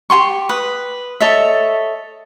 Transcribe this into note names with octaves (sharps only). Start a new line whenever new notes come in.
G4 G#5 C6 C#6
B4 D#6
A4 C#5 D#5 E5